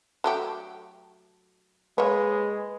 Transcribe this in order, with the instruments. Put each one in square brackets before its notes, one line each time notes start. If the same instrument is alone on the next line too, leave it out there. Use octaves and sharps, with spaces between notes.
[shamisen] F#3 A3 G4
[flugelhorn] G#3 [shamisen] A#3 C#5 [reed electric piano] B4